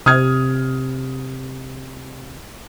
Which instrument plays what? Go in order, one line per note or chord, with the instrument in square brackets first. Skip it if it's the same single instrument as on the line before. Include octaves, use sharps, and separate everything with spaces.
[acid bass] C3 [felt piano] D#6 F6 G#6